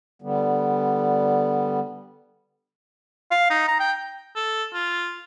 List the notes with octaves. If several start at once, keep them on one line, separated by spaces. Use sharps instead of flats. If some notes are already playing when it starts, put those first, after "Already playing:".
D3 G3 B3
F5
D#4
A#5
G5
A4
F4